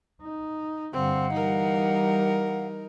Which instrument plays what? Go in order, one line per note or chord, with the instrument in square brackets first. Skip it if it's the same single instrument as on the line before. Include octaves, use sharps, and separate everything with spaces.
[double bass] D#4
[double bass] G2 D3 [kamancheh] C4 [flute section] F5 F#5
[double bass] E3 G3 [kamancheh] D#4 A#4